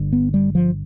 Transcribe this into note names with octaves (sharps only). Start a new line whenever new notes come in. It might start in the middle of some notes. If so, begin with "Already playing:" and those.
Already playing: G1 G2 D3
B3
G3
F3